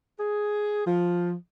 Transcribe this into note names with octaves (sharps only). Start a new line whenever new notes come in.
G#4
F3